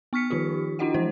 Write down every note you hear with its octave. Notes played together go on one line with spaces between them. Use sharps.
B3 C#6 F6 B6 C#7
D#3 F3 D#4 F4 G4
D4 E4 F#4 D#5 F#5 G5
E3 F3 G#3 E4 C5 F#5